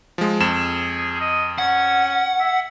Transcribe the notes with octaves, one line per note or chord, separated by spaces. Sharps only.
F3 G#3
F2 G#4 E7
D#5
C#4 F#5
E5